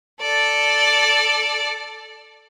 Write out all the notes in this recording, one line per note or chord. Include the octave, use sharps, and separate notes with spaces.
A4 D5